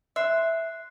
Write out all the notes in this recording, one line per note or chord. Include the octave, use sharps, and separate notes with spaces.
E5 C6 F#6 C7